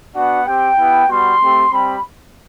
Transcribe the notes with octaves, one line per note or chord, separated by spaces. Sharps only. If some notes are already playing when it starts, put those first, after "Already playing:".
B3 D4 F#4 F#5
C4 G4 G5
B3 E4 G4
G3 B3 F#4 C6
A3 C4 G4
G3 C4 G4 B5